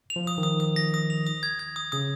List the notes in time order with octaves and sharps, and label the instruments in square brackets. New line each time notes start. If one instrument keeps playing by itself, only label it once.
[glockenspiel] F7
[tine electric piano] F3
[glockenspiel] D#6
[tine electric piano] D#3
[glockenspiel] D#6
D#6
A#6
D#6
F7
D#6
G#6
G#6
D#6
[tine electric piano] C#3 [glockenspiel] D#6